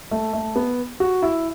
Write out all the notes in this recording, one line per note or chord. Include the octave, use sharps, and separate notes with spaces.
A3
A3
B3
F#4
E4